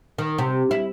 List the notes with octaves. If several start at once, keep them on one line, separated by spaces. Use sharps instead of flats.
D#3
C3
E4